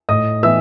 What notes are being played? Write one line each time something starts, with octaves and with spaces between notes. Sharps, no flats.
A2 D#5 D#6
E3 B3 E5 E6